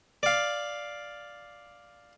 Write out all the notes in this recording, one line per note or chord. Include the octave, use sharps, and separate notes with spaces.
D5 F5